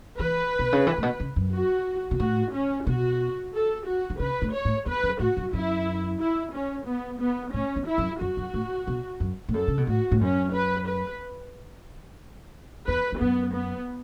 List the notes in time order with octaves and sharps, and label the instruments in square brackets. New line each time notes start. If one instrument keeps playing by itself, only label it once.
[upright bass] E3 [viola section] B4
[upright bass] B2
C#3
E3
A2
B2
C#3
F#2
[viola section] F#4
[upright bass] B2
[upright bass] A2 [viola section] F#4
[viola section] C#4
[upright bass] B2 [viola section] F#4
[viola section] A4
F#4
[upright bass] E3
[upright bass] C#3 [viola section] B4
[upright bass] A2
[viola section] C#5
[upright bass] A2
[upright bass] E2 [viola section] B4
[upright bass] F#2
[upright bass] A2 [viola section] F#4
[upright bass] F#2
[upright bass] F#2 [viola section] E4
[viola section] E4
C#4
B3
B3
[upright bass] A2 [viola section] C#4
[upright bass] E2
[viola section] E4
[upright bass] F#2
[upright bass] F#2 [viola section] F#4
[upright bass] F#2
A2
B2
F#2
A2
[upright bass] F#2 [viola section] A4
[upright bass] C#3
B2
[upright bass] A2 [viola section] F#4
[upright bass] A2
[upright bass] F#2 [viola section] C#4
[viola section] B4
B4
[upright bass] E2 [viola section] B4
[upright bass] E2
[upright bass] F#2 [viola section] B3
[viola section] B3